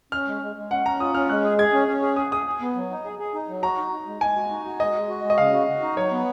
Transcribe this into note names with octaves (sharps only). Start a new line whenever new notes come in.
C#4 F6
G#3
G#3
G#3
C#4 F#5
C#4 A#5
F4 D#6
C#4 F6
G#3 F#6
G#4
G#4 G#6
C#4
C#4
G#4
G#4 D#6
G#4 D#6
G#4
B3
F#3
D#4
G#4
G#4
D#4
F#3
F#4 A#5
D#4
D#4
G#3
G#3 G#5
F#4
D#4
F#4
G#3 D#5
G#3
F#4
G#3
D#5
C#3 F5
F#4
F#4
D#4
F#3 C#5
B3